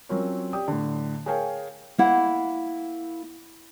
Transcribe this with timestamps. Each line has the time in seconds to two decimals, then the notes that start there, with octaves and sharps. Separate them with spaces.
0.09 F#3 C4 C#4 F4 A#4 C#5
0.53 G4 D5 G5 D#6
0.68 A2 D3
1.26 G#4 A#4 C#5 F5 G5 G#5
1.98 A#3 E4 F#5